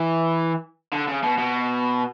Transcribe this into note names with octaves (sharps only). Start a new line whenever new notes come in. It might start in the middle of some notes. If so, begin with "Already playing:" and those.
Already playing: E3
D3
C#3
B2
B2